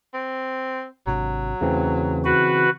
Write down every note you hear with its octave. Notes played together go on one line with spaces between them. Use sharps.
C4
G#1 C3 F#3 D4
E2 C#3 E3 A3 C4
F#4 B4